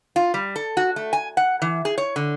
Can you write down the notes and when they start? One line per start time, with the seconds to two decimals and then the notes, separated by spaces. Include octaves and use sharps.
0.16 F4
0.34 G3
0.56 A4
0.77 F#4
0.96 A3
1.13 G#5
1.37 F#5
1.62 E3
1.85 G#4
1.98 C#5
2.16 D3